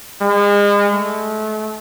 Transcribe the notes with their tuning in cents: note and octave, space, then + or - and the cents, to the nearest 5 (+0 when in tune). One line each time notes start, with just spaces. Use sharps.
G#3 -35
A3 -35